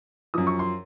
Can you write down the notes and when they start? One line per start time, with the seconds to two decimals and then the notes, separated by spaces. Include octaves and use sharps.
0.34 F#2 F3 D#6
0.47 C#6
0.59 C6